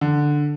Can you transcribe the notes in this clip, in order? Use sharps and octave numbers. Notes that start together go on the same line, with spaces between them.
D3